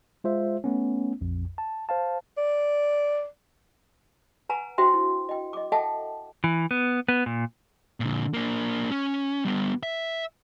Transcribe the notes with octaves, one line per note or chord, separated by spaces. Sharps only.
G#3 F4 C5 E5
A3 B3 C#4
A#1 F2
A5
C5 F5 A5
D5
B4 F#5 G#5 A#5
D4 F#4 C5 E5 G5 C6
E4
D#5 G5
D#5 D6
A4 D#5 E5 F#5 G5 A5
E3
B3
B3
A#2
A#2 D3
A#3 D4
C#4
G3 B3
E5